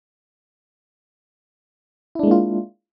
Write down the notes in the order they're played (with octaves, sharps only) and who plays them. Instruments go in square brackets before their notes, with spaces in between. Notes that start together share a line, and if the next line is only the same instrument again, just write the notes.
[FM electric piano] E4
D4
G#3
A#3
F4